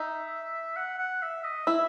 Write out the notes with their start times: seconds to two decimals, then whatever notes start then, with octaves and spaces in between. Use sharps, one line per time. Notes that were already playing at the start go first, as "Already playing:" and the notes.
Already playing: D#4 E5
0.76 F#5
0.99 F#5
1.22 E5
1.44 D#5
1.67 E4 E5